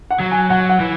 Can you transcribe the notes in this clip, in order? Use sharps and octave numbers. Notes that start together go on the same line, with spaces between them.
F#5
F#3
G#5
F#3 F#5
F#5
E3